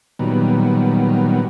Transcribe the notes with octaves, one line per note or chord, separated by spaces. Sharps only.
A#2 D#3 F#3 G3 B3